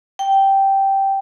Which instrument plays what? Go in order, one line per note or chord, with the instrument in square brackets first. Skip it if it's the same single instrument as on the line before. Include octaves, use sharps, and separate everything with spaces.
[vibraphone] G5